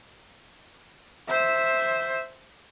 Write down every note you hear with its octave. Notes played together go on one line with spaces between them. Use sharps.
C5 E5